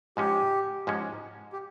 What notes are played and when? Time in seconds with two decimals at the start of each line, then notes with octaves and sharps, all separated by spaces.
0.17 G#2 F3 G#3 C#4 G4
0.87 G#2 F3 G#3 C#4
1.53 G4